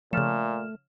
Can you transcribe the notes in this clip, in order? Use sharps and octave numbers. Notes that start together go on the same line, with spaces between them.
A#2 C#3 F3 A3 F6 E7